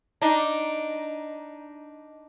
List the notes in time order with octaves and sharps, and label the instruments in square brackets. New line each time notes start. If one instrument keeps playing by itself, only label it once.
[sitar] D4 D#4